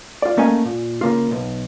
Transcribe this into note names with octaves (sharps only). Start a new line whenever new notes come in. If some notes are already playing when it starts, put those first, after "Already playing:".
F4 D5
A3 A#3 C#4 D#5 G#5
A#2
C#3 A#3 F4
B1